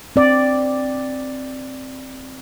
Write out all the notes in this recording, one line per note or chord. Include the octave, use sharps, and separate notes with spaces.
C4 D5